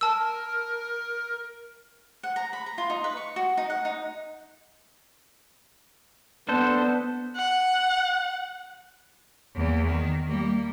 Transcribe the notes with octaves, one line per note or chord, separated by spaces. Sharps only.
A#4 A5 E6
F#5
A#5
B5
A#5
F4
D#4
B4
C#6
F#4
D#4
F#5
D#4
B3 D4 A4 C5
F#5
E2 A#3
D#3
G3 A#3